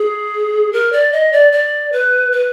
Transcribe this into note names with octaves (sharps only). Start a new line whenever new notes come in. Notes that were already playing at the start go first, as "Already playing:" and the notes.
Already playing: G#4
A#4
D5
D#5
D5
D5
B4
B4